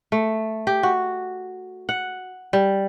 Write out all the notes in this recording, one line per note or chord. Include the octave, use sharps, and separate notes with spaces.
A3
G4
F#4
F#5
G3